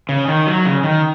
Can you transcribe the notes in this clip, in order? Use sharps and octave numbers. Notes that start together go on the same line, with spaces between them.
C#3
D#3
F#3
C#3
D#3